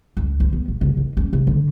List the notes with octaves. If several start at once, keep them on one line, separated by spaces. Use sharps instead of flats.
C#2
D2
B3
A#2
C#3
D#3
C#4
C3
D3